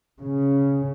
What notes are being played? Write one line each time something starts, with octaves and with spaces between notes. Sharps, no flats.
C#3